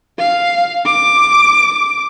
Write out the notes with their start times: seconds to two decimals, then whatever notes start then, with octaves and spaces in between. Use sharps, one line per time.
0.19 F5
0.86 D6